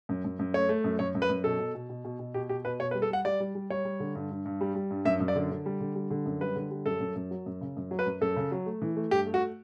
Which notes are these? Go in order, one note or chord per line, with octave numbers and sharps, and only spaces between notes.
F#2
F#2
F#2
A3 C#5
A3
F#2
F#2 C#5
F#2
B4
F#2
B2 A4
B2
B2
B2
B2
B2
B2 G4
B2 G4
B2 B4
B2 C#5
B4
G3
A4
G3 F#5
G3 D5
G3
G3
G3 C#5
G3
D3
G2
G2
G2
G3
G3
G2
F#2 E5
F#2
D5
D3
D3
G3
D3
G3
D3
F#2
G3 B4
D3
G3
F#2 A4
F#2
F#2
F#3
F#2
C#3
F#2
F#3
B4
F#2
F#2 A4
C#3
F#3
A3
E3
A3
G2 G4
A3
F#4